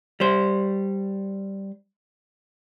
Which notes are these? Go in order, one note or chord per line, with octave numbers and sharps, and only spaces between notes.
G3 C5